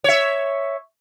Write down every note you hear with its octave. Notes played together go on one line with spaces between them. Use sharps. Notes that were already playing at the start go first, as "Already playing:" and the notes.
C#5 E5